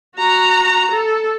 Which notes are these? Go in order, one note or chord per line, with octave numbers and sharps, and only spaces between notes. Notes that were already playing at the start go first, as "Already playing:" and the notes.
F#4 A#5
A4